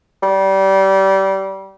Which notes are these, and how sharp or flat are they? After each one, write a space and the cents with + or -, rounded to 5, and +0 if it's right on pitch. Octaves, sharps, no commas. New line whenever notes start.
G3 -25